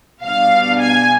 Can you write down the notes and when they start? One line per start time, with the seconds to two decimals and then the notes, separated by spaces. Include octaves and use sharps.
0.23 B2 G3 B3 D4 F5
0.80 G#5